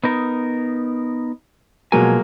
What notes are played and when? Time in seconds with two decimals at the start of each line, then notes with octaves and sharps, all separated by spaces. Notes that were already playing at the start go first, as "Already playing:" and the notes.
0.04 B3 D#4 A#4
1.92 B2 F3 F#3 G#3 A#3 G#5